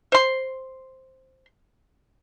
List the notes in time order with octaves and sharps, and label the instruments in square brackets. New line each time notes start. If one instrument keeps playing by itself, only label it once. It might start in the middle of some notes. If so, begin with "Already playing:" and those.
[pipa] C5 C6